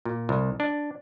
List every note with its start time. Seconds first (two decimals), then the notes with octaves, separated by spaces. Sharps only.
0.05 A#2
0.29 C2
0.60 D4